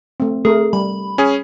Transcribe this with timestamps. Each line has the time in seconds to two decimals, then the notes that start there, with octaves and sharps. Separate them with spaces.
0.20 A3 C4
0.45 A3 G#4 A#4
0.73 G3 B5
1.18 C#4 G#4